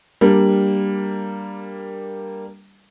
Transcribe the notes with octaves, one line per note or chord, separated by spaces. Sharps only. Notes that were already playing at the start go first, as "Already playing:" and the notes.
G3 A#3 D4